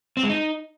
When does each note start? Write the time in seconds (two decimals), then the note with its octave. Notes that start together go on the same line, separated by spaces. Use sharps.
0.17 C4
0.23 G#3
0.29 D#4